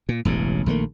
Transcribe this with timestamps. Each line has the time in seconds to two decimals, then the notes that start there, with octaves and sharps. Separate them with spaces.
0.09 A#2
0.25 E1 A1 G2 C#3
0.66 A#1 D#3 A3 A#3